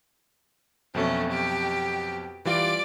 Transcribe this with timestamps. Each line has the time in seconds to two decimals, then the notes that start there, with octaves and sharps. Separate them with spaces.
0.94 F2 B2 F#3 A3 C#4
1.31 G4
2.45 E3 G3 F4 D5 D6